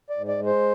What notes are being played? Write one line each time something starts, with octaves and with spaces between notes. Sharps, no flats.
D5
G#2
D5
G#3
C5